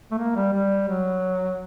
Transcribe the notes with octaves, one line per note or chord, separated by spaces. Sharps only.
A3
A#3
G3
G3
F#3